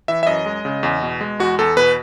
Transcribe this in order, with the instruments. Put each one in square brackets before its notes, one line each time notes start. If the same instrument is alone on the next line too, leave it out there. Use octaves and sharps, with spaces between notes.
[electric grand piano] E3 E5
E5
F#2 D#5
G#3
C#3
E2
B2
G#3
E2 F#4
E2 A4
B2 B4